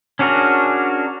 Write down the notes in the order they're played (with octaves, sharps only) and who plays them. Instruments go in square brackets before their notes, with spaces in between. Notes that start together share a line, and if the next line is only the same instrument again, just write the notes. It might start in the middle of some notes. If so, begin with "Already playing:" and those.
[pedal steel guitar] C#4 D4 F#4 G#4 A#4